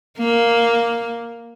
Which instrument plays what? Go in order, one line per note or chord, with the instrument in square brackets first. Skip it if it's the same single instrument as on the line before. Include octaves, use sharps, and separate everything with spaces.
[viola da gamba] A#3